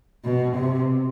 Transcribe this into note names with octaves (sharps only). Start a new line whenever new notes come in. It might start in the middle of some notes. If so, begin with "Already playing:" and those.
B2
C3